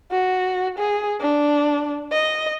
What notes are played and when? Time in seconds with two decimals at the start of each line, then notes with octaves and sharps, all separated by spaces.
0.12 F#4
0.79 G#4
1.21 D4
2.12 D#5